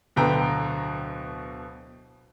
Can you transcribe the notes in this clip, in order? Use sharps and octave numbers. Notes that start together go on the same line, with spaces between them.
D1 B2 D3 B4 G5 A#5